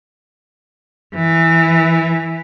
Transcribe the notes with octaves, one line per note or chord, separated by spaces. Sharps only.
E3